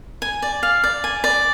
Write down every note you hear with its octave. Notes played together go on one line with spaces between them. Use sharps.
G#5
D5
F5
D5
G#5
D5